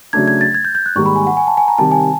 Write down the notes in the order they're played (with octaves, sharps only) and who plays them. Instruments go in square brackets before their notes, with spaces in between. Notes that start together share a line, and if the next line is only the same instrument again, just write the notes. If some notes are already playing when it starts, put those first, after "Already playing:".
[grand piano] C#3 F#3 A3 D4 [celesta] G#6
[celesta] G#6
A6
G#6
G6
G6
F#6
[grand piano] G#2 D#3 G3 A#3 [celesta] C#6
[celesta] B5
G#5
F#5
G#5
A5
G#5
A#5
[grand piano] C3 D#3 G3 [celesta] A5
[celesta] G#5